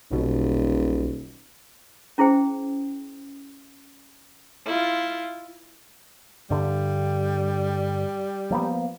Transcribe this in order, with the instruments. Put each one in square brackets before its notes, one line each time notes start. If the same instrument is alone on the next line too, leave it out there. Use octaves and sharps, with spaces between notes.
[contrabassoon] D#1 [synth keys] B1 B2
[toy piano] C#4 E4 G#4 C5 G5
[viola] E4 F4
[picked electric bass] G2 D3 [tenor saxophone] G3
[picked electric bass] F3 A#3 B3